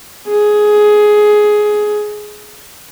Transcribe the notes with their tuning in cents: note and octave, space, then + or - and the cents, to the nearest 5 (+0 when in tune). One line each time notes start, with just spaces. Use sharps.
G#4 +15